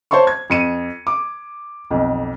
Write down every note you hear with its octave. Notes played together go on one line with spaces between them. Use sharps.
C5 C#5 A5 C6 C#6
G#6
F2 C#7 D#7
D6
B1 F2